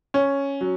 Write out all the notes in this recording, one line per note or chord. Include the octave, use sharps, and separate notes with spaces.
C#4
F#3